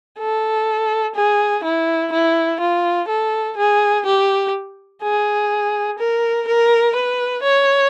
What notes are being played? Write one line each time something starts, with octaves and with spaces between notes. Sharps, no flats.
A4
G#4
E4
E4
F4
A4
G#4
G4
G#4
A#4
A#4
B4
C#5